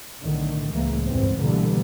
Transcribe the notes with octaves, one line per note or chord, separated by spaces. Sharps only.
B1 A2 D3 D#3
C#2 A2 E3 G#3 A#3
G#1 E2 G2 A#2 C4
B2 D3 E3 G3 A3 A#3